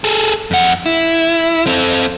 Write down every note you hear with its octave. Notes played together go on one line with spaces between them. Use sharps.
G#4 A4
F2 F#5
E4
C4 A4